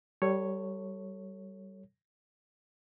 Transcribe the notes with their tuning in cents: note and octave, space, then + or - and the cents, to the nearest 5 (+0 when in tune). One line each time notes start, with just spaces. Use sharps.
G3 -20 A4 +25 C#5 +0